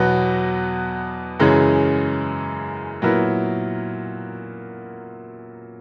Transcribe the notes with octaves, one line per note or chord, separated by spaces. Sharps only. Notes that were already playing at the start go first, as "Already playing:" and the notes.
Already playing: E2 B2 F#3 B3
F#2 C#3 E3 G#3 C#4
A#2 F#3 B3 E4 A#4